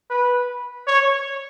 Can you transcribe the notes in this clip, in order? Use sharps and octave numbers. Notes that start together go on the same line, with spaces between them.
B4
C#5